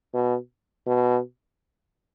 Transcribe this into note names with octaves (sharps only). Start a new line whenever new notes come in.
B2
B2